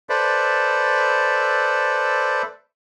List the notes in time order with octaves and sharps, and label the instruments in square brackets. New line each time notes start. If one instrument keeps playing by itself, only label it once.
[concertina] A4 B4 C5 D5 E5